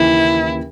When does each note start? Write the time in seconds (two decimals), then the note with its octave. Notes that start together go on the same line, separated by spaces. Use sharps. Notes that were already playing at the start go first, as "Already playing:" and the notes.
Already playing: D#2 C#3 E3 E4